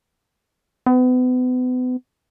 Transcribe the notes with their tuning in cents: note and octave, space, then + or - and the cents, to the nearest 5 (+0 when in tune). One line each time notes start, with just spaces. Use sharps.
B3 +35